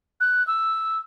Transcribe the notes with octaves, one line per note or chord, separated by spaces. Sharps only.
F#6
E6